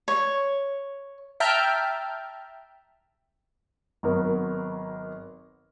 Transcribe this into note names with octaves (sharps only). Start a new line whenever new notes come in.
C#5
E5 G5 A5 A#5 F6 G6
G#1 F#3 B3 A#4